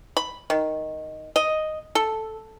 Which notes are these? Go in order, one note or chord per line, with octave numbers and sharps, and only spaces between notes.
B5
D#3
D#5
A4